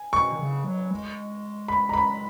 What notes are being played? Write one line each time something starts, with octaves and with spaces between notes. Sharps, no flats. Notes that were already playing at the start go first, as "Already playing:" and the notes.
Already playing: G#5
B2 C#6
D#3
C#3
F#3
G#3
B5
A#5
B5